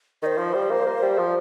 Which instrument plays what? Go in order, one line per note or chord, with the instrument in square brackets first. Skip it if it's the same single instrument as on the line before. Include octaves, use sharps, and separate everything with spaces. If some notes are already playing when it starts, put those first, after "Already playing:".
[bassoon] D#3 [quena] D#5
[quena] C5
[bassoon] F3
G3
A#3
A#3
G3
F3